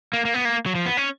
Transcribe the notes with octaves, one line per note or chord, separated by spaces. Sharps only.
A#3
A#3
B3
A#3
F#3
F3
B3
C#4